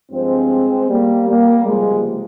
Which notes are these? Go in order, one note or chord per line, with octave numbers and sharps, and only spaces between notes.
G2 F3 G#3 C4
G3 A#3
G3 A#3
C#2 C3 F3 G#3